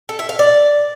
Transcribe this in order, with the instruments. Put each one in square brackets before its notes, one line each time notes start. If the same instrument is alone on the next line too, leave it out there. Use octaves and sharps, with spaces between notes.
[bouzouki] A4
E5
F5
D5